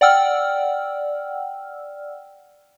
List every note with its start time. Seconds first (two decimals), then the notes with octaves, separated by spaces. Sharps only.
0.01 D5 F#5 G5 E6 F6